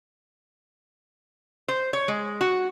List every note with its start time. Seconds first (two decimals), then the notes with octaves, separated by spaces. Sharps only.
1.68 C5
1.93 C#5
2.08 G#3
2.41 F#4